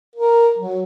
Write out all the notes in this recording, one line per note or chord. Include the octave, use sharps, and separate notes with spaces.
A#4
F#3